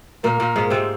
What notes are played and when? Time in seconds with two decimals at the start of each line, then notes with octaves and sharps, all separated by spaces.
0.24 A#2 A#3 A#4
0.40 A#2 A#3
0.56 G#2 G#3
0.70 C3 C4